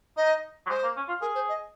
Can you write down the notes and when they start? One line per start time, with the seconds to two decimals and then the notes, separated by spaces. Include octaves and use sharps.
0.17 D#4 D#5
0.66 F#3
0.70 G#3 C5
0.83 A#3
0.96 C#4
1.08 F4
1.21 G#4 A#4
1.35 C5
1.49 D#5